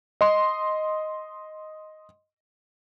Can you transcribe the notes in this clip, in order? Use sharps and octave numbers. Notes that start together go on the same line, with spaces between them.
D#5 C6